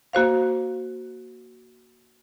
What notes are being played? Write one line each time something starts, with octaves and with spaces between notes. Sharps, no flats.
A#3 F#4 C5 F5